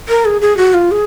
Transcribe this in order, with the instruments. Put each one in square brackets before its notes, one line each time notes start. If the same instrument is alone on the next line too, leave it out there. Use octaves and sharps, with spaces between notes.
[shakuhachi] A#4
G#4
G#4
F#4
F4
G#4